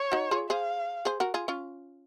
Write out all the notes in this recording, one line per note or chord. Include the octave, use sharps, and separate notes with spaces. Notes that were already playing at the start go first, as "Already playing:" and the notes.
Already playing: C#5
D#4 F#4
F4 G#4
G#4 C5 F5
G#4 C5
F#4 A#4
F4 G#4
C#4 F4